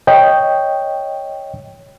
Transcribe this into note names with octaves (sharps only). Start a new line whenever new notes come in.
C#5 D#5 G5